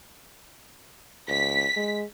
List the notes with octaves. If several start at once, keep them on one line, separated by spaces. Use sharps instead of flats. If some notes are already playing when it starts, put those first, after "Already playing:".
C#2 B6
G#3